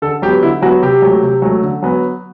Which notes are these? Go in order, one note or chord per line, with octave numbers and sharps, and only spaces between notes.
D3 A4
F#3 B3 G4
D3 E4
F#3 B3 F#4
C3 G4
F#3 A3
C3
F#3 A3
D3
F#3 B3